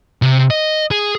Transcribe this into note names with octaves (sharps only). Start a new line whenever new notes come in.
C3
D#5
G#4